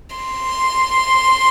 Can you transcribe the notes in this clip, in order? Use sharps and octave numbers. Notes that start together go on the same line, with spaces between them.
C6